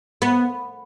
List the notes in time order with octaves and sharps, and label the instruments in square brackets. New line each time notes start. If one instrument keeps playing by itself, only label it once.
[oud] B3